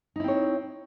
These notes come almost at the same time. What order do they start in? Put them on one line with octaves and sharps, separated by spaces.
D#4 E4 C4 C#5